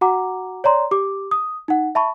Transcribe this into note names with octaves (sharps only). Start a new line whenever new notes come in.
F#4 F#5 A#5 D6
C#5 D5 A#5 C6
G4 D6
D#6
D#4 F#5
E5 A5 B5 C#6